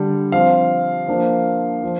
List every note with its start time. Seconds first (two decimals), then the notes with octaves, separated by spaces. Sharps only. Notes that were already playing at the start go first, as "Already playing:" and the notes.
Already playing: D3 G3 D4
0.32 F3 C4 F5
1.08 F3 A#3 D4
1.83 F3